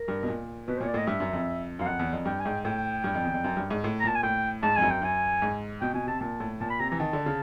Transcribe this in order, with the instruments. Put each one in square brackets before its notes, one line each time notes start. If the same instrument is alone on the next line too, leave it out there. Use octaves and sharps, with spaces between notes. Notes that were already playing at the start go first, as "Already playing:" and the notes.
Already playing: [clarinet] A#4
[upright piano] G2
B2
A#2
[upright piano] B2 [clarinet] B4
[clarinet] C5
[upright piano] A#2 [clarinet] C#5
[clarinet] D5
[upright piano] A2 [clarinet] D#5
[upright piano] G2 [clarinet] E5
[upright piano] F#2
F2
[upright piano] F#2 [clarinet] F5
[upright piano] F2 [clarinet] F#5
[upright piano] E2
F2
[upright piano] G2 [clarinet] G5
[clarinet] G#5
[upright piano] G#2 [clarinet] G5
[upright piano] A2 [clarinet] G5
[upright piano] G2
F2
E2
F2
F#2
G2
G#2
A2
[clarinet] A#5
[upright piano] A#2 [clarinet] A5
[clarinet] G#5
[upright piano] A2 [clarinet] G5
[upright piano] G#2 [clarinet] A5
[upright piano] F2 [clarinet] G#5
[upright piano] F#2
[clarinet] G5
[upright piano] F#2 [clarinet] G#5
[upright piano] G#2
[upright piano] B2 [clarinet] G5
[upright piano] B2 [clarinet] G#5
[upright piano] C3 [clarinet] A5
[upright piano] A#2 [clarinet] A5
[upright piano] A2
[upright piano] A#2 [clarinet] A5
[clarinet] B5
[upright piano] C3 [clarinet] A#5
[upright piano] E3 [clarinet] A#5
[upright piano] D#3 [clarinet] A5
[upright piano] D3
C#3